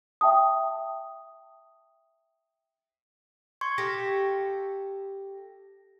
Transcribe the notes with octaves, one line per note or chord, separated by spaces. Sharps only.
E5 G5 A5 D#6
C6 C#6 G#6
G4 A4 F5 A#6